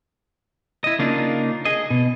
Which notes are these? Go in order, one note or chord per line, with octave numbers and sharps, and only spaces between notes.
E4 D#5
C#3 A#3 D4 D#4 F4
G#4 D#5
B2